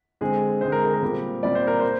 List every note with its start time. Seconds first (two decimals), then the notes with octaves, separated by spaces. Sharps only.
0.21 D3 G#3 C4 G#4
0.61 D3 G#3 C4 C5
0.72 A#4
0.83 G#4
0.94 A#4
1.02 A#2 G3 C4
1.43 A#2 G3 C4 D5
1.55 C5
1.67 A#4
1.80 C5